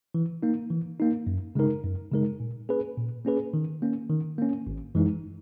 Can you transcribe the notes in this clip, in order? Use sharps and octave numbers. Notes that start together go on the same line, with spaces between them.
E3
A#3 D#4
E3
A#3 D#4
F#2
C#3 G#3 D#4 A#4
F#2
C#3 G#3 D#4 A#4
A#2
A#3 C#4 G#4 B4
A#2
A#3 C#4 G#4 B4
D#3
A#3 C#4
D#3
A#3 C#4
G#1
F#2 E3 G#3 D#4